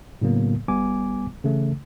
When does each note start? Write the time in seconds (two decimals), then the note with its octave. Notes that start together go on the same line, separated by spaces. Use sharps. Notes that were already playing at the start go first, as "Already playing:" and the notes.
0.21 A2 C#3 F#3 A#3 B3
0.68 G1 G3 B3 G#5 D6
1.44 C#3 E3 A3